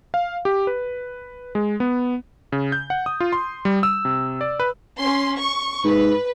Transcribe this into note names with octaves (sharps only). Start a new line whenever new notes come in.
F5
G4
B4
G#3
B3
C#3
G6
F#5
D#6
F4
C6
G3
E6
C3
D5
B4
C#4 C6
C#6
G#2 B4